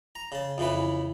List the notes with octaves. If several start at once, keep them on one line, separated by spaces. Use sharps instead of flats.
A#5
C#3 A5
F2 C#3 E3 B4